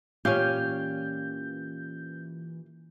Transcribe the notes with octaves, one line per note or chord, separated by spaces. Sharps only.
A#2 E3 C#4 G4 F5 G6